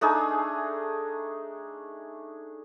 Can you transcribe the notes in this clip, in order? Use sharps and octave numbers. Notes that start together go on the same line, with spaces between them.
A3 D4 D#4 G#4